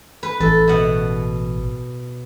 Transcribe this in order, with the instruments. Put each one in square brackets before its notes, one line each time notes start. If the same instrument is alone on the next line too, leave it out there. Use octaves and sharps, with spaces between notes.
[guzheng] B4
[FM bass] A1 [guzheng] A4
[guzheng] B2 F#5